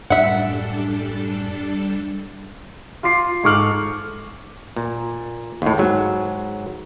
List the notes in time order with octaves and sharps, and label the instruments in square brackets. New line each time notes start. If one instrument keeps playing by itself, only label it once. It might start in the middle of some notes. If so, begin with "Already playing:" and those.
[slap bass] F#2 A2 [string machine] G3 D4 A4 [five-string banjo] E5 F#5
[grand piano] F4 C6 D6 C7
G#2 A4 C#6 D6 F6 F#7
[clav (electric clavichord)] A#2
D#2 A2
G#2 F#3